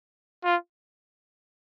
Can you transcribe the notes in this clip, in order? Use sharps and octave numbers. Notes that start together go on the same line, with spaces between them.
F4